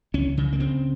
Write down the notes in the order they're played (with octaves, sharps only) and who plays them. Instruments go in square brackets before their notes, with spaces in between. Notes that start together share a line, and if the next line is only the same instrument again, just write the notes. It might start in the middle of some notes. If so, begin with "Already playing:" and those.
[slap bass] C#2 C#4
C#3
A#3
C#3 C4